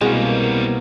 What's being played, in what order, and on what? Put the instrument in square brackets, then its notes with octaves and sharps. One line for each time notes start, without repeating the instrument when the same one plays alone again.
[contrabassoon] C2 [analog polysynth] B2 A#3 [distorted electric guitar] G3 C#4 [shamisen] G#3